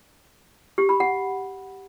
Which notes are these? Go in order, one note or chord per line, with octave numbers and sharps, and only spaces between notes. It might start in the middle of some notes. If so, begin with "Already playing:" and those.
G4
B5
F#5